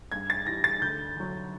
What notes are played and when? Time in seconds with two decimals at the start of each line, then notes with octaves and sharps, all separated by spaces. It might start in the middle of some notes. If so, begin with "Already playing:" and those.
0.12 G2 G#6
0.30 A6
0.47 E3 G3 A#6
0.64 A6
0.81 D2 G6
1.16 D3 F#3